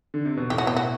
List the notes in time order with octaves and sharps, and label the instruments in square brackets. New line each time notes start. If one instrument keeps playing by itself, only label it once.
[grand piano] D3
C3
B2
[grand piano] A2 [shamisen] G4
[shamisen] F#4
[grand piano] B2 [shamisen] G4
[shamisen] F#4